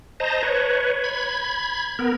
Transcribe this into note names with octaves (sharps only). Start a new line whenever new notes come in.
C5 D#5 A5 A#5
B4 C#5
B5 G#6
B3 A#4